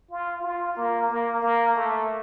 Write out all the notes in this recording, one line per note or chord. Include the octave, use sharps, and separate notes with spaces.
F4
F4
A#3
A#3
A#3
A3